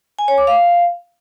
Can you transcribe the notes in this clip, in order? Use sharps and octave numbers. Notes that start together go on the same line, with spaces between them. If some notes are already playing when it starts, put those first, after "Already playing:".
G#5
C#5
D6
F5